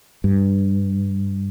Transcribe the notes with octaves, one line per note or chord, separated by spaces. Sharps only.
G2